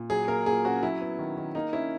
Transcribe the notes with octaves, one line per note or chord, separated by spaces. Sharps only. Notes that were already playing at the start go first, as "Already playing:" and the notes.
Already playing: A#2
F#3 G#4
A#3 A#4
A#2 G#4
C#4 F#4
F#3 E4
B3
D#3
D#3
A#3 D#4
C#4 E4